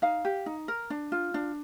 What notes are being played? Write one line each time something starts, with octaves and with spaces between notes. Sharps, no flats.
D#4 F5
G4
D#4
A#4
D4
F4
D4